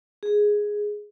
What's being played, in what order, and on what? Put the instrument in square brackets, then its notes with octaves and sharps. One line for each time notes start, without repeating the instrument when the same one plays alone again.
[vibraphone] G#4